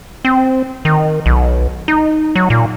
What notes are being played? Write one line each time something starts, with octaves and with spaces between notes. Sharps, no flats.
C4
D#3
B1
D#4
F#3
A#2